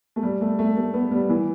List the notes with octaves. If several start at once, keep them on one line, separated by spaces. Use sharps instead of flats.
A3
G3
A3
A3
A3
B3
G3
E3